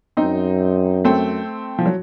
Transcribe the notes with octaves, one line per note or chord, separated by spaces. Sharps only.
F#2 C4 D#4
A3 C4
F3
F#3